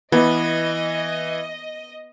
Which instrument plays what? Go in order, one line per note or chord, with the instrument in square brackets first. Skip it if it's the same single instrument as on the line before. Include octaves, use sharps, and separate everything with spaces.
[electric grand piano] E3 [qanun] B3 [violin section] D#5